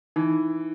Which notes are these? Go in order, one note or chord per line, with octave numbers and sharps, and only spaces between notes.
E3 D#4